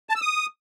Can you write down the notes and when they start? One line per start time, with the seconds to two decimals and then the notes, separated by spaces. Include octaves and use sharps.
0.09 A5
0.15 E6
0.22 D#6